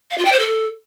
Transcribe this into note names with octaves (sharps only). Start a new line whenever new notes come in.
F5
F4
G5
C5
A4